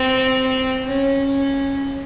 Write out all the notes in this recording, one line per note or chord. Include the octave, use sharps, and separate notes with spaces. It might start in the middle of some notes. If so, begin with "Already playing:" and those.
Already playing: C4
C#4